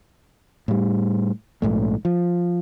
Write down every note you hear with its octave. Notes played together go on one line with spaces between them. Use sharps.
A2 G3
A#1 G#2 A3
F3